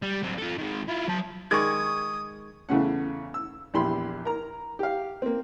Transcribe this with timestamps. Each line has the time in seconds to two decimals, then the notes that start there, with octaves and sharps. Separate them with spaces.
0.02 G3
0.23 F#3 C4
0.38 F4 A4
0.58 D#3 G#3
0.88 E4 F4
1.08 F#3 A5
1.51 D#3 G#3 D5 C#6 D#6 G#6
2.69 E2 C#3 A3 C#4 F#5
3.34 E6
3.74 A#1 E2 G4 B5 C6
4.25 A#4 A#5
4.79 G4 F5
5.22 A#3 C4